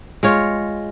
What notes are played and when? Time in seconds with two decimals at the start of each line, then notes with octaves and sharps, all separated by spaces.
0.23 G#3 F4 C#5